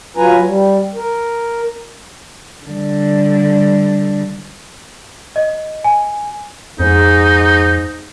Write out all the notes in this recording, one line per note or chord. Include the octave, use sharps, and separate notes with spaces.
F#3 F4 B4 G#5 A#5
G3
A#4
D3 G3
D#5
G#5
F2 G#2 D#4